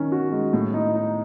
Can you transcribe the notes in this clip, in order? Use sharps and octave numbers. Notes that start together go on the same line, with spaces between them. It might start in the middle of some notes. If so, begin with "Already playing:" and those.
Already playing: D#3 C#4
F#4
G#3
A2
D#4
D#4